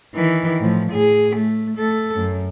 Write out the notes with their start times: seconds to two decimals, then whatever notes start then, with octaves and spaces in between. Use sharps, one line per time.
0.15 D#3 E3
0.60 A2 F3
0.93 A2 G#4
1.36 A3
1.77 A3 A4
2.18 F#2